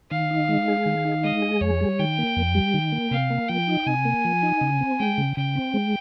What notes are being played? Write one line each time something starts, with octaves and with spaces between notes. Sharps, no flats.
D#3 F5
D#4
G#3
G#4
D#3
D#4
G#3 D#5
G#4
F2 C#5
G3
D#3 G5
A#3
F2
G3
D#3
A#3
C3 F5
A#3
F3 G5
D#4
C3 G#5
A#3
F3
D#4
C#3
C4
G#3 G5
C#3
C#3 G5
C4
G#3